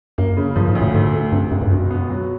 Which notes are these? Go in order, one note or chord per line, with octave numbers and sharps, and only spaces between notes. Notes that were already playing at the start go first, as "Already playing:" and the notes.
F#2 A#3
C#3
G2 F3
G#2
D2
A2
G#2 A3
A3
G2 C3
C#2 F#2
G2
F#2 B2
B3
F#3